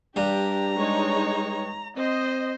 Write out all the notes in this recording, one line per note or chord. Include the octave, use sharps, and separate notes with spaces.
G2 D4 G4 A#5
G#3 D#4 C#5
C4 C5 D#5